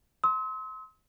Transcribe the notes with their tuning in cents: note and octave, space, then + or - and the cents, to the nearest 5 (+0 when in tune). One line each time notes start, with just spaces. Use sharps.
C6 -5 E6 -45